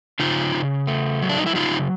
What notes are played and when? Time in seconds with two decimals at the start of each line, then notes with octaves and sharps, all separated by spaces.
0.20 C#3 D#4 F4
0.55 C#3
0.87 A3
1.22 F#3
1.29 D4
1.38 D#4
1.47 E4
1.56 C#3 D#4 F4